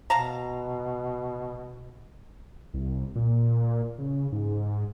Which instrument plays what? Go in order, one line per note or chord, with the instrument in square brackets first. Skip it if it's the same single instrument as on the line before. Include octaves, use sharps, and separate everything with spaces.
[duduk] B2 [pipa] F5 A5 A#5
[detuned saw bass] C2
A#2
C#3
G#2